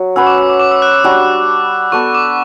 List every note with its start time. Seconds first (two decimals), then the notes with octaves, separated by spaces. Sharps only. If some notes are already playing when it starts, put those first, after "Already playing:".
Already playing: F#3
0.16 C#4 F#4 B4 E6
0.27 D6
0.38 E6
0.49 D6
0.60 D6
0.71 E6
0.82 F#6
0.94 E6
1.04 G3 D4 F#4
1.92 B3 F#4 A4 D5 C#6
2.14 D6